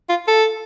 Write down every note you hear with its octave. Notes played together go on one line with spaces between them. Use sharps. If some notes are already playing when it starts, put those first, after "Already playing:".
F4
A4